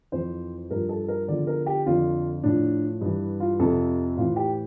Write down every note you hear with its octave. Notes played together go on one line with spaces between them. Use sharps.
F2 E3 C5
G2 F3 A#4
A4
A#4
E2 D3 F3 D5
A#4
G4
F2 D3 F3 F4
A2 F3 D4
G2 E3
F4
F2 C3 F3 A4
A2 E3 F4
G4